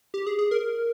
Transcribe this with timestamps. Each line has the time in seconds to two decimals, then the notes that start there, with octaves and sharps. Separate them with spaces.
0.14 G4
0.27 G#4
0.39 G#4
0.51 A#4